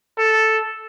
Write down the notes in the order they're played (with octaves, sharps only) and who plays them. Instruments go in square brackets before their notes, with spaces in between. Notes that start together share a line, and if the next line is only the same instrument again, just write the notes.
[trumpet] A4